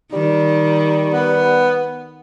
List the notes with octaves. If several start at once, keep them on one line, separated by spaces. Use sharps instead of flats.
D#3 G3
B3